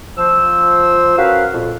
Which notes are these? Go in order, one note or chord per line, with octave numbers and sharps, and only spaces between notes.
F3 C5 E6
C#4 F#4 A#4 B4 F5
F2 A#2